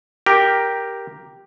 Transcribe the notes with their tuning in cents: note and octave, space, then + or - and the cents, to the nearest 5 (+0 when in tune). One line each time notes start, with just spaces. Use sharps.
G4 +0 A#4 +5